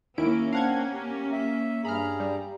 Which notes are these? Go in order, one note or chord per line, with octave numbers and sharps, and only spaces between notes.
D#2 A#3 C#4 E4 D7
C4 D4 F5 F#5 G#6
G4
E5
G2 G#4 A#5 B5 F6
G3